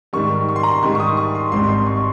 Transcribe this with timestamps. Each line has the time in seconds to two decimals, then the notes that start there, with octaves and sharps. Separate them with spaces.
0.13 G#2 D#3 G3 C#6
0.49 C#6
0.56 C6
0.63 A#5
0.71 C6
0.83 G#2 D#3 G3 C#6
0.95 C#6
1.00 D#6
1.17 C#6
1.35 C6
1.52 G#1 G#2 G3 C4 C6
1.69 C6
1.87 C#6
1.97 C#6